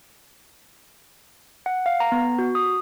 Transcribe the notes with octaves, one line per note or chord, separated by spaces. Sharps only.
F#5
F5
A#5
B3
F#4
D#6